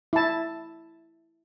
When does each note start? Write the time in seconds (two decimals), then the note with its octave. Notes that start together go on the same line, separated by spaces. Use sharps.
0.13 E4 A5